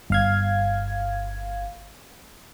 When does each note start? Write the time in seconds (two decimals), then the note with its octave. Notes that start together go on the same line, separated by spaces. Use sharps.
0.10 G1 F5 G#6